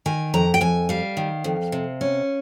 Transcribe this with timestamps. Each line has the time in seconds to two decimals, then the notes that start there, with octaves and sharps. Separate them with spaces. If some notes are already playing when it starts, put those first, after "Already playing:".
0.06 D#3 G#5
0.34 F2 A#5
0.54 G5
0.61 F2 G#5
0.89 G3 F5
1.17 D#3
1.44 F2
1.72 C3
2.01 C#4